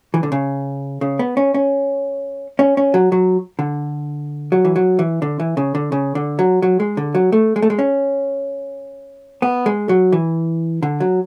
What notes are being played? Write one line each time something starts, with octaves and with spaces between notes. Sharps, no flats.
E3
D3
C#3
C#3
B3
C#4
C#4
C#4
C#4
F#3
F#3
D3
F#3
E3
F#3
E3
D3
E3
C#3
D3
C#3
D3
F#3
F#3
G#3
D3
F#3
A3
G#3
A3
G#3
C#4
B3
G#3
F#3
E3
D3
F#3